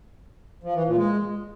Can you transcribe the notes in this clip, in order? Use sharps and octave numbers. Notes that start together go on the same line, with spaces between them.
F3
E3
A#2
G#3